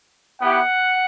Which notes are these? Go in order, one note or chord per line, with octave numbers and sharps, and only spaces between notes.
B3 E4 G4 F#5